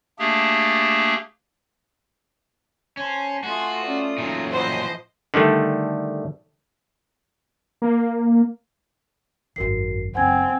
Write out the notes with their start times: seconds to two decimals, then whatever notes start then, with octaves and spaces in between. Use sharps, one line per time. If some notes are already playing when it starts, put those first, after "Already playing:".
0.19 A3 A#3 D4 G4 G#4
2.97 C#4 C5 A5 C6
3.44 A3 F4 F#4 G#5 C6 D#6
3.84 C#4 D5
4.18 A#2 F#3 C#4 D#4
4.52 A2 E3 F3 C5 D#5 F#5
5.34 D3 D#3 G3 A3
7.82 A#3
9.56 G#1 F#2 F#4 A#4 C7
10.15 F#1 F#3 C4 F#5 G#5 G#6